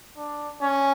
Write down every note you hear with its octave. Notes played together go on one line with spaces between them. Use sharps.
D4
C#4